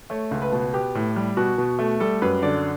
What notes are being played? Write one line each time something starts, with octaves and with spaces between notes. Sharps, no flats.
A3 C#5
C#2
B4
B2
B3 G4
A2
G3
B2 F#4
B2
A3
G3 A4
F#2 B4
D3 D5